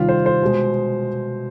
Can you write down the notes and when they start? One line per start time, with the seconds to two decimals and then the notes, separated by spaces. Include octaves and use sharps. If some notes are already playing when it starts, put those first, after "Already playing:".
Already playing: C3 D#3 G3 F4
0.09 C5
0.26 C5
0.42 B2 G#3